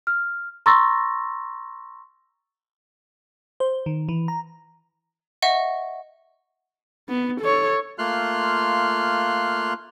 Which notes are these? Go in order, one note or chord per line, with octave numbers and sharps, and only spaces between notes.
F6
A#5 C6 C#6 E6 A6 A#6
C5
D#3
E3
A#5
D#5 E5 F#5 C#6
B3
A4 C#5
A3 A#3 F4 C6 F6 F#6